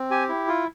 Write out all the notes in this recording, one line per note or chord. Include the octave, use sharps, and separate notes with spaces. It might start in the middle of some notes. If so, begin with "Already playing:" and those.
Already playing: C4
G4 G#5
E4
F4